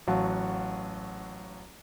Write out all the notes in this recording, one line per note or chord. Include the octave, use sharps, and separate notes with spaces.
A1 F#3 F5 F#5 A5 C#6